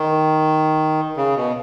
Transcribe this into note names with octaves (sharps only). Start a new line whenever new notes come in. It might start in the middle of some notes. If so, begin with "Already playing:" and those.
Already playing: D#3
C#3
B2